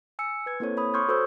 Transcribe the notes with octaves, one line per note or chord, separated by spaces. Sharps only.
G#5 E6 C#7
B4 G#6
A#3 C4 E4 A4 C5 C#5
C#5 B5 D#6
C6 C#6 D#6 F6 G6 G#6
F#4 A4 C5 C#5 E6 G6